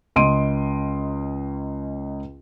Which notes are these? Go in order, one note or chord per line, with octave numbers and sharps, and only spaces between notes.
C#2 D#5 C6 D7 D#7